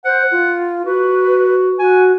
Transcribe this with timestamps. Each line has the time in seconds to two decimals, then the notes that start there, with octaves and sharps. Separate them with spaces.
0.05 C5 F#5
0.32 F4
0.85 F#4 B4
1.79 F#4 G#5